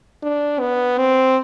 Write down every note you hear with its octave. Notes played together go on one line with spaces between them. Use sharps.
D4
B3
C4